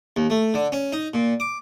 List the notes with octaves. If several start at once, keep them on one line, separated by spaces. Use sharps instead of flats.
D#2
A3
D3
C#4
D#4
A#2
D6